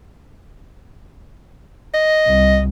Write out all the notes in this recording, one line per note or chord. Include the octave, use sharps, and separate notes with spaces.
D#5
C2